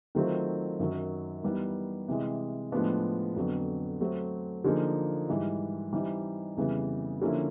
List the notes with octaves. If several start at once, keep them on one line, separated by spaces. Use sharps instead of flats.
D#3 F#3 A3 C4 F4
F#2 D#3 F#3
E3 G3 B3 D#4
C3 E3 G#3
A2 F3 G#3 B3 D4
F2 D3 F#3 B3
F#3 A3 C4
D3 F3 A#3 D#4 G#4
G#2 E3 G3
E3 G3 C4 D#4
F2 C#3 E3 G3 B3
D3 F3 A#3 C#4 E4